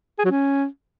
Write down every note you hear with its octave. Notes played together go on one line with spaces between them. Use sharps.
G#4
F#3
C#4